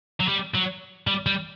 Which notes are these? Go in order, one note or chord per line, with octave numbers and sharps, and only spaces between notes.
F#3
G3
F#3
G3
G3